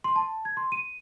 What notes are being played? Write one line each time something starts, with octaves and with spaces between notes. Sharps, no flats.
C6
A5
G#6
C6
D#7